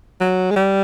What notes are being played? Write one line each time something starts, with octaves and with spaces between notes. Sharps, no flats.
F#3
G#3
G3